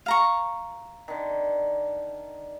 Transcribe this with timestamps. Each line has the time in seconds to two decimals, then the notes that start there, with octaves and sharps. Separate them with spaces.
0.06 F5 A#5 C#6
1.08 D3 D#3